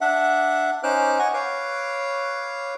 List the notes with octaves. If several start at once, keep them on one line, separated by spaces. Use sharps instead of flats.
D4 E5 F#5
C#4 D#4 C5 D6 F6 F#6
D#5 F#5 G#5 C#6
B4 C#5 F5 D6